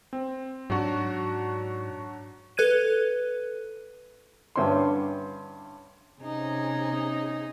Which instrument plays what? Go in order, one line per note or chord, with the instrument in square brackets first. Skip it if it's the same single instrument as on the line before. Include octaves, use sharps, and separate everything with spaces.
[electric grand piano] C4
[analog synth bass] G#2 [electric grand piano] F#3 D4 F#4
[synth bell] A4 B4 F#6 G#6 D#7
[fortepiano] G2 D3 C#4 E4 C5 C6
[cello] C3 G#4 [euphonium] C#4 [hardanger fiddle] D#4